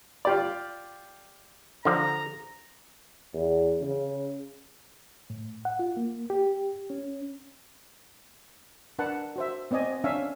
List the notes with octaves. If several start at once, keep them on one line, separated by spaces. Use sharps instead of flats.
F4 G4 D5
D3 F3 A#5
E2
C#3
A2
F#5
F4
A#3
G4
C#4
D4 A#4 B4 F#5 A5
F#4 C5 E5
B3 C4 D5 D#5 G#5
C#4 D4 E5 F5 G#5